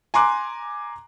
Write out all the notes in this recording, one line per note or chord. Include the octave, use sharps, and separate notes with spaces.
G#5 A#5 C6 D6 F#6